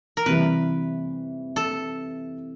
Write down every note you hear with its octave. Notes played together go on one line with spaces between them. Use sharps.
A#4
C3 E3 G3 B4
A4